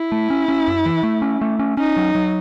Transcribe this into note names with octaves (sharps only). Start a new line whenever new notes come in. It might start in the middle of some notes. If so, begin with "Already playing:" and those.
Already playing: E4
A3
C#4
C#4
F#2
E3
A3
C#4
A3
C#4
C#4 D#4
F#3
F#3